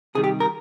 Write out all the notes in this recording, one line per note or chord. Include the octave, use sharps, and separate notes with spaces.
C3 D#3 G3 G#4
G4
A#4